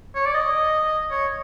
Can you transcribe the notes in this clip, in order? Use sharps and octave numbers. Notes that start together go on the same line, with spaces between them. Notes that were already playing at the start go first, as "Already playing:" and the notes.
C#5
D5
D#5
C#5